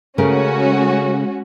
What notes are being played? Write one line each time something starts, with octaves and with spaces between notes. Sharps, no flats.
C#3 G#3 A3 C#4 F#4 A#4